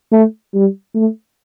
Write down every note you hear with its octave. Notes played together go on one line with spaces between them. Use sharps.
A3
G3
A3